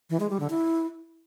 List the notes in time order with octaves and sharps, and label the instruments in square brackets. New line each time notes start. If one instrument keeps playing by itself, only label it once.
[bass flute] E3
G#3
G3
D3
E4